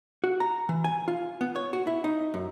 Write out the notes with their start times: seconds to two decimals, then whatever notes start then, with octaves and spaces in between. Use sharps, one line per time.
0.24 F#4
0.40 A#5
0.69 E3
0.84 G#5
1.08 F4
1.41 B3
1.56 C#5
1.73 F#4
1.87 E4
2.04 D#4
2.34 F#2